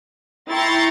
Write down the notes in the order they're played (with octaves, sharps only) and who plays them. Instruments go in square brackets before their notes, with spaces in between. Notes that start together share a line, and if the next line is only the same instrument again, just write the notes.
[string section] E4 G5 C#6 [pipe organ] A#5 C6 A6